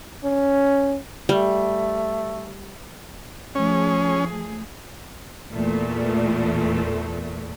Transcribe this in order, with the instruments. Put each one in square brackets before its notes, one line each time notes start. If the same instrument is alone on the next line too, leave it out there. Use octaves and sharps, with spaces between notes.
[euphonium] C#4
[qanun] G3 [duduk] A3
[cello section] F3 A3 G#4 [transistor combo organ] C#4
[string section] E2 A#2 A3